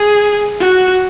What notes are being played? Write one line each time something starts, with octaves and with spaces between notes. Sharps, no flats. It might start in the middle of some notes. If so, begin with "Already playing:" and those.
Already playing: G#4
F#4